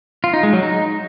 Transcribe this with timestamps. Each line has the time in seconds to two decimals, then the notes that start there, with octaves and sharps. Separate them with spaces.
0.24 F4
0.34 D#4
0.43 G#3
0.53 F#3
0.63 D#4